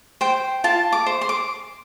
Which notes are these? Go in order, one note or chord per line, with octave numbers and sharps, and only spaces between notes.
C5 G5
F4 A5
D6
C5
C6
D6